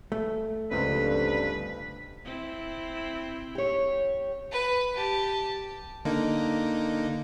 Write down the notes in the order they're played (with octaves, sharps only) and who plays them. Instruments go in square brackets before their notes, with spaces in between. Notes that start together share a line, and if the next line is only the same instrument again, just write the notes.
[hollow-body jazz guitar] A3
[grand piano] C#2 C4 [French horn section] G2 D3 F3 [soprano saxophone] B4
[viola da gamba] C4 E4
[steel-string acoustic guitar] G4 C#5
[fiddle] B4
G4 A5
[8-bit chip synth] D3 A#3 D#4